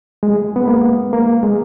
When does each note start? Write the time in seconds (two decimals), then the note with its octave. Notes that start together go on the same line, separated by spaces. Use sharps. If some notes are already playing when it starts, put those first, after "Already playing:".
0.23 G#3
0.56 B3
0.68 A#3
1.13 A#3
1.43 G#3